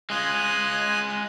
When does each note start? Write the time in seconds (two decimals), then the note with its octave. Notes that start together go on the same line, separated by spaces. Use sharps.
0.10 G#3 F4 G#5 D#6 F#6